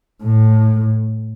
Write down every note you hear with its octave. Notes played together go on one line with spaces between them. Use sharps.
A2